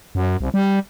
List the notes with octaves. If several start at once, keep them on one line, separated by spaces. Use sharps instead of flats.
F#2
C2
G3